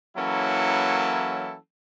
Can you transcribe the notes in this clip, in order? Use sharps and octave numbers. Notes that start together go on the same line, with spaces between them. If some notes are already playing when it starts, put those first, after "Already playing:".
E3 F#3 A#3 C#4 E4 A4